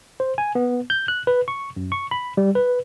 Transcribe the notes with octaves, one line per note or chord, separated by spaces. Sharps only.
C5
G#5
B3
G6
F#6
B4
C#6
F#2
C#6
B5
G3
B4